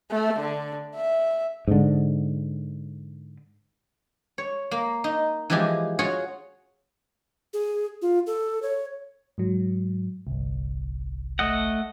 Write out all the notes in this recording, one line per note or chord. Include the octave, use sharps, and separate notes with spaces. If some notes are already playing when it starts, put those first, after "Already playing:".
A3
D3
E5
G#2 D3
C#5
A#3
D#4
E3 F3 G#3 G4 G#4
F4 F#4 G#4 C#5 F#5
G#4
F4
A4
C#5
G#2 F#3
G1 C2
A3 D#5 F#5